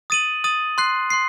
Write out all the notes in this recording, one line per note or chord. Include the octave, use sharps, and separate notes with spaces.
D#6 A6 D#7 F#7
D#6 A6 D#7 F#7
C6 F#6 C7
C6 F#6 C7